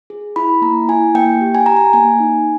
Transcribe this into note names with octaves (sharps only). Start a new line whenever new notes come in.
G#4
E4 B5
A#3 A#5
E4 G#5
A#3 G5
G4
G#5
G4 A#5
G#5
A#3 G#5
D#4